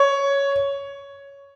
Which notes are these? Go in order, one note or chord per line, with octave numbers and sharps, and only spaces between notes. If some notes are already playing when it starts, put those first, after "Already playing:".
Already playing: C#5